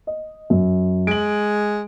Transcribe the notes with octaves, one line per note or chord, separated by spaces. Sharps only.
D#5
F#2
G#3 D7 F#7